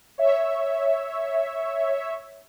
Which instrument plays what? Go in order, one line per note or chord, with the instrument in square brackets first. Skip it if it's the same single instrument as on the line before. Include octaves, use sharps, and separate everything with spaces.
[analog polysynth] C#5 E5